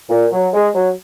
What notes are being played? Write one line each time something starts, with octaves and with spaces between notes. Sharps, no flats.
A#2
F#3
G#3
F#3